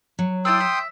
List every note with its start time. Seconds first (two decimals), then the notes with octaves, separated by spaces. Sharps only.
0.19 F#3
0.45 E4 D5 G5 C6 D#6 E6
0.60 E5